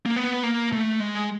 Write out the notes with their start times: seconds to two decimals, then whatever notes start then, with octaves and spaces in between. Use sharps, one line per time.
0.06 A#3
0.16 B3
0.43 A#3
0.73 A3
1.00 G#3